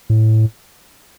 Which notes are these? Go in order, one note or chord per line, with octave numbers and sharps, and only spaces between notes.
A2